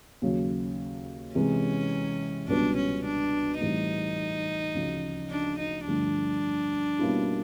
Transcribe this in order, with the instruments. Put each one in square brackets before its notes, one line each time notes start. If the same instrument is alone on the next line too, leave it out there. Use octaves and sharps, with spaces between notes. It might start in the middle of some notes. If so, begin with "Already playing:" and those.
[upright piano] D#2 C#3 F#3
[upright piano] C3 E3 G#3 [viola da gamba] C#4
[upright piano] C#2 B2 G3 B3 [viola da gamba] D4
[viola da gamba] C#4
D4
[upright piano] A2 E3 G3 C4 [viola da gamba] D#4
[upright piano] D2 C#3 F3 A3
[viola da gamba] D4
D#4
[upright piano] G2 D3 F3 A3 [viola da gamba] D4
[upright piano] B2 G3 A#3 C#4 E4